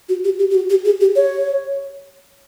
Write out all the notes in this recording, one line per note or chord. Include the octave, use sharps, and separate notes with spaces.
F#4
G4
G4
G4
F#4
G4
G#4
G4
C#5